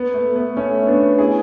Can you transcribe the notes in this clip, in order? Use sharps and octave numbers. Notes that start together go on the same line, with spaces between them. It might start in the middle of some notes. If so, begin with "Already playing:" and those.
Already playing: B3
A3
B3
A3 C#4
B3 D4
E4 G#4